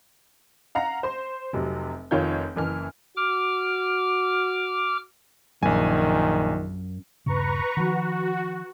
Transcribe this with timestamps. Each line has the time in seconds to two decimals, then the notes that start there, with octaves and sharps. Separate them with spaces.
0.75 F5 F#5 A#5 A#6
1.03 C5 C6
1.53 F1 C3 F#3
2.11 F1 D#3 F4 C#5 G6
2.56 F#1 E3 F6
3.16 F#4 D6 F6
5.63 A#1 F#2 D#3 G#5
7.26 D#1 G2 C#3 B4 A#5 C#6
7.77 D#3 F3 F#4